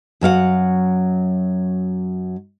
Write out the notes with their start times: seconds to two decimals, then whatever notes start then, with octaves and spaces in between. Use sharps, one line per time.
0.21 F#2 F#3 F5 F#5